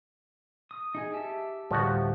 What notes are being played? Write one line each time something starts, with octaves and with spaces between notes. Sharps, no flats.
D#6
D#4 G#4 G#5
G4 E5 A5
D2 A2 F3 G3 F#4